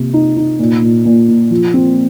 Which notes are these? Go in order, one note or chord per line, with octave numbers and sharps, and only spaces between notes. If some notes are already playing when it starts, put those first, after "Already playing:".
Already playing: C3 A#3
D#4
D#4
A#2
A#2
A#2
A#2
F3
C4